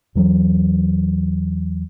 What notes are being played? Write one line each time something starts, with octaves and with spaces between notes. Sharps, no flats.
E2 E3 F#3